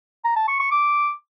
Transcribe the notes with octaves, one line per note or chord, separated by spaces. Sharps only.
A#5
A5
C#6
C#6
D6